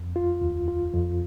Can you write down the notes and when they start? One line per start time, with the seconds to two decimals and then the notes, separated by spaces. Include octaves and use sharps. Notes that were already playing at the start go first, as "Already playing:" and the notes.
Already playing: F2
0.16 F4
0.42 D#2
0.68 F4
0.94 F2